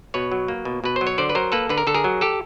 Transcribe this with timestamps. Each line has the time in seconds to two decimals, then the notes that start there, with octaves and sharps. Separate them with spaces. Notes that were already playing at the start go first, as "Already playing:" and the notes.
0.14 B2 B4 C#5
0.32 F#3
0.48 A#3
0.65 B2
0.84 B2 B4
0.96 C5
1.01 F#3
1.07 C#5
1.18 D3 C5 D5
1.29 B4
1.35 F#3 A#4 C5
1.52 A#3 A4 B4
1.69 D3 B4
1.78 A#4
1.87 D3 A4
1.95 G#4 A#4
2.04 F#3
2.21 G4 A4